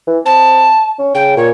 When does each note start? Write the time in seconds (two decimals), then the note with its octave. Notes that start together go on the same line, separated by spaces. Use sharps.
0.07 E3
0.26 C4 A5
0.99 C#4
1.15 C#3 G5
1.37 A#2 C#5